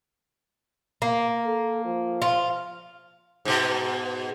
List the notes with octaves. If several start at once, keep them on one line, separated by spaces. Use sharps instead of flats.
A#3
A4
F3
F4
G#2 B2